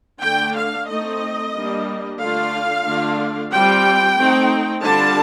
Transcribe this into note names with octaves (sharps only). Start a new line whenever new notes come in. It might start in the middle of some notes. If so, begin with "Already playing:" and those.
D3 A3 D4 G5
F5
A3 C4 D#4 D#5
G3 A#3 D4
D3 A3 D4 F4 F5
D3 A3 D4 F4
G3 C4 F4 G5
A3 C4 D#4
D3 G3 D4 F4 A5